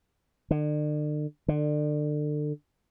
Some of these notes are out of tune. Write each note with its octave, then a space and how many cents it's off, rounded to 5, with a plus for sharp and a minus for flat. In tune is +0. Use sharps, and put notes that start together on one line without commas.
D3 +40
D3 +30